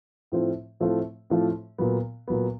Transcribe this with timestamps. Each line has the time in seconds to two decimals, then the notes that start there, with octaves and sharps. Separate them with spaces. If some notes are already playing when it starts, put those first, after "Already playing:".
0.32 A2 F3 A3 C4 F4
0.80 A2 F3 A3 C4 F4
1.30 A2 F3 A3 C4 F4
1.78 A#2 F#3 B3
2.28 A#2 F#3 B3